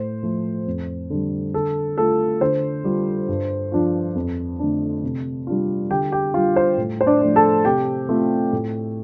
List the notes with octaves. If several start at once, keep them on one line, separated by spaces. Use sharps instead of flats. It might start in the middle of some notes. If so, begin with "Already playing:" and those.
Already playing: A2 C5
F3 A3
F2
D3 G3
D3 A4
A3 F4 A4
D3 C5
G3 F4
G2
F3 D4 F4
F2
D3 A3 D4
C3
G3 D4 F4
D3 G4 G5
G4 G5
G3 D4 F4 F5
C5
A2
C5
D4 D5
F3 A3 D4
A4 A5
C3 G4 G5
A3 C4 F4
A2